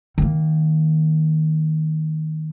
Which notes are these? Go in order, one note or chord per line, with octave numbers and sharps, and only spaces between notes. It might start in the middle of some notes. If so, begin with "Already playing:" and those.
D#3 A#3